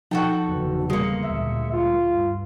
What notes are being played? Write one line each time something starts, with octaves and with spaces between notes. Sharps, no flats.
F3 D#4 F#4 A4 G5 A5
F#1 E2 D3
G3 G#3 A#3 C#7
A1 D2 A#2 E5
F4
G2